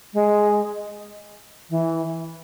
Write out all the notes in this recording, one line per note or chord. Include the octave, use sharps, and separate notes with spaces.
G#3
E3